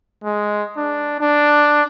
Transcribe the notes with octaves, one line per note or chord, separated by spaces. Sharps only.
G#3
D4
D4